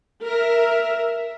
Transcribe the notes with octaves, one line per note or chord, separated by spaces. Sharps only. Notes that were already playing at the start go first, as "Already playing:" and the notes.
A#4 E5